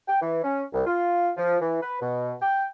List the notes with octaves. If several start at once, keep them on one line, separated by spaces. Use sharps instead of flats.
G5
E3
C#4
C2
F4
F3
E3
B4
B2
G5